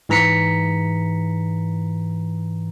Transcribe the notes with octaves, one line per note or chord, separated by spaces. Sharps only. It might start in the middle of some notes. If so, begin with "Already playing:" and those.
G#2 E3 A#5 B6 C#7